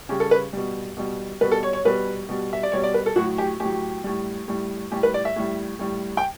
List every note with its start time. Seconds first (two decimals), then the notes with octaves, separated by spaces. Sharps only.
0.09 C#3 G3 G4
0.20 A4
0.31 B4
0.53 B2 G3
0.97 B2 G3
1.41 B2 G3 B4
1.51 A4
1.63 C#5
1.73 C#5
1.85 B2 G3 B4
2.29 B2 G3
2.53 E5
2.63 D5
2.72 B2 G3 C#5
2.83 D5
2.94 B4
3.06 A4
3.16 A2 F#3 F#4
3.38 G4
3.60 A2 G4
3.65 F#3
4.04 A2 G3
4.48 A2 G3
4.91 A2 G3 G4
5.03 B4
5.14 D5
5.25 E5
5.36 A2 G3
5.79 A2 G3
6.17 G5